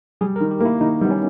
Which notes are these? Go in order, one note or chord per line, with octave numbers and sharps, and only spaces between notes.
G3 G#4
A#4
D#3
G4
A#3 E4
D#3 D#4
G3 B3
C#4